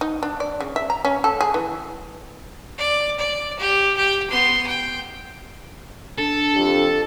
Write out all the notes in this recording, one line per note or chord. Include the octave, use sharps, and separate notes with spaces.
D#4
D4
D5
C#3
E5
A#5
C#4
A4
G#4
E3
D5
D5
G4
G4 G5
B3 C6
G5
D4 A4
F2 G4